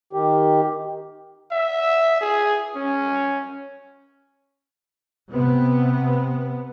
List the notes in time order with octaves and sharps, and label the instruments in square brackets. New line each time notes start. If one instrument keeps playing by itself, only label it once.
[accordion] D#3 G4
[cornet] E5
G#4
C#4
[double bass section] C3 B3